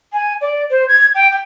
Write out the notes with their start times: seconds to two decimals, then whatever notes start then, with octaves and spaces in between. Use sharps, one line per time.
0.12 G#5
0.41 D5
0.70 C5
0.88 G#6
1.15 G5
1.31 G5